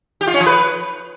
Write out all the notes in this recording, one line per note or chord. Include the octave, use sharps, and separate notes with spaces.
G4
F4
C#4
F3
B4